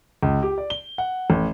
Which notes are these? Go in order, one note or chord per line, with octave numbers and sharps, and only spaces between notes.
C#2
G4
D5
G7
F#5
A1